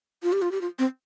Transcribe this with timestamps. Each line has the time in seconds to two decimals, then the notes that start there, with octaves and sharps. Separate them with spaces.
0.23 F4
0.33 G4
0.42 F4
0.52 G4
0.61 F4
0.79 C4